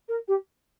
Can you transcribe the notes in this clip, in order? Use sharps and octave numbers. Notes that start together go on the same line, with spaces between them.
A#4
G4